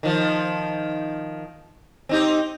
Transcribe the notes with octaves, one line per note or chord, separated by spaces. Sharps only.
D#3 F3
C4 D#4 G4